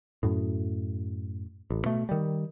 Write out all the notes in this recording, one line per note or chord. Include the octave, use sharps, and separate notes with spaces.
F#2 A2
A1
B2 A3
D#3 G3